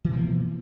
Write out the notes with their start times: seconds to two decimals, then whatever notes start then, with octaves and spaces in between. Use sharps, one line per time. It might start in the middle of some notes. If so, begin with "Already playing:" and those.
0.05 E3
0.09 B2
0.13 F3
0.17 A#3